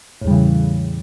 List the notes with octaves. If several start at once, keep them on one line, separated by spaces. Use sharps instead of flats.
E2 A2 C#3 E3 G3